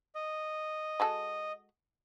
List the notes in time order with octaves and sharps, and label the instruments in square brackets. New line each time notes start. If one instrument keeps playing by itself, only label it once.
[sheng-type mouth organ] D#5
[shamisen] G#3 F#4 A4